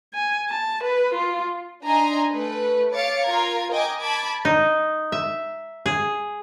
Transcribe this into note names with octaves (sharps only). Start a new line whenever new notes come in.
G#5
A5
B4
F4
D4 D#4 D#5 G#5 A#5 C6
A3 B4
C#5 F5 D6 A6 C#7
F4 A#4 A#5 G#6
A#4 D#5 G5 G#5 D6 G#6
A5 B5 D6 G#6
D#4
E5
G#4